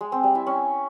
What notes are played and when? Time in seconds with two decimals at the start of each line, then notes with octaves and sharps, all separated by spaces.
0.01 G#3
0.12 C4
0.24 G3
0.35 E4
0.47 C#4